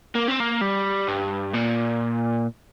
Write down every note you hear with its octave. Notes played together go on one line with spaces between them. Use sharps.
A#3
C4
A#3
G3
G2
A#2